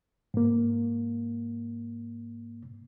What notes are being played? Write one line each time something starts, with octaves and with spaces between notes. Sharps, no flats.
G#2 A#3